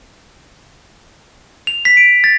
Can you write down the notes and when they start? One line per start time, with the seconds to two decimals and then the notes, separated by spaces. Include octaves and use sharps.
1.67 F7
1.85 B6
1.97 D7
2.24 A6